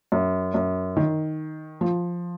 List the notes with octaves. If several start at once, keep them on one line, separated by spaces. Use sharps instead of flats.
F#2
F#2
D#3
F3